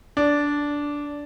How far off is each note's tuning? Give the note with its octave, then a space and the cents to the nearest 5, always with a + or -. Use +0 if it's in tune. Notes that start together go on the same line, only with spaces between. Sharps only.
D4 -10